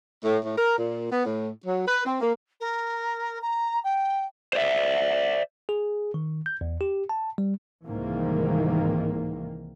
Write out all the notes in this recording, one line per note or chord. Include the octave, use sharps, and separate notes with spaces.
A2
A2
A#4
A#2
B3
A2
F#3
B4
C4
A#3
A#4
A#5
G5
C5 D5 E5
G#4
D#3
G6
E2
G4
A5
G3
C2 G#2 D#3 E3 A#3